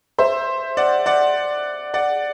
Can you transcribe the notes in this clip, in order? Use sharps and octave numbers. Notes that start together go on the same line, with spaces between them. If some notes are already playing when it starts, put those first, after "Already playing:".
C5 E5
D5 F#5
D5 F#5
D5 F#5